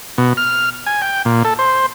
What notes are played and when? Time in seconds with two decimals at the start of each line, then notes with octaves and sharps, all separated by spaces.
0.18 B2
0.37 F6
0.87 G#5
1.02 G5
1.25 A#2
1.45 A4
1.59 C5